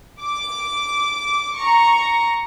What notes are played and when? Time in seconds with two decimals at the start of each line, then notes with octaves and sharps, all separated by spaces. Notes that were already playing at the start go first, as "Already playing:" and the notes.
0.22 D6
1.58 A#5 C#6